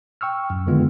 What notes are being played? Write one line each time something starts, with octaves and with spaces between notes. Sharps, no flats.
G5 C#6 E6 F6
F#2
F2 D3 D#3 G#3 B3 F4